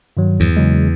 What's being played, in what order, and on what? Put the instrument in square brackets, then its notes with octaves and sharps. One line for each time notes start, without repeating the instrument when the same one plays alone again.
[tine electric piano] G2 D#3 F#3
[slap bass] E2
[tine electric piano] C#3 F#3 G#3